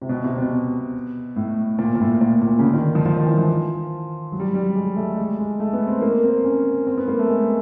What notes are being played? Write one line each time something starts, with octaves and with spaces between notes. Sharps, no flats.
C3
B2
C3
B2
A2
A#2
A#2
A2
A#2
A#2
C#3
D3
D#3
F3
F3
D#3
E3
F3
F#3
G3
F#3
G3
G#3
A3
G#3
G#3
A3
B3
C4
A#3
C4
C#4
C4
B3
A#3
A3
G#3